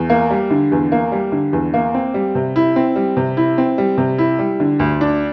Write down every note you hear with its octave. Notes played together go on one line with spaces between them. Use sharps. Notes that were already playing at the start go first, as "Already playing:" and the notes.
Already playing: E2
A#3
G3
D3
E2
A#3
G3
D3
E2
A#3
C4
G3
C3
E4
C4
G3
C3
E4
C4
G3
C3
E4
G3
D3
D2
D4